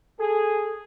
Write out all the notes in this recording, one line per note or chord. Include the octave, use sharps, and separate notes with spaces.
G#4 A4